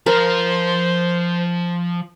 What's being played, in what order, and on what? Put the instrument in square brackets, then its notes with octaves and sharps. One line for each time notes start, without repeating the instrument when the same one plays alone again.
[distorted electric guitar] F3 F5 [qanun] A#4 [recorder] C5